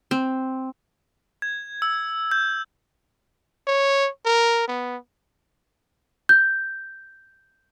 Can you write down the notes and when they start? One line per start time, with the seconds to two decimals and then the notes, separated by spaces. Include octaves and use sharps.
0.11 C4
1.42 G#6
1.82 E6
2.32 G6
3.67 C#5
4.25 A#4
4.68 B3
6.29 G6